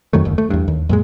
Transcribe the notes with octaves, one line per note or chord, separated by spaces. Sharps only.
F2 D#3 F#3 A3
F#1 D#2
A3
E2 G2
D#2
F#2 A#2 G#3